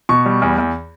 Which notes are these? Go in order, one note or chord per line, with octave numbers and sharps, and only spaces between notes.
B2 C#6
G3
E2
E2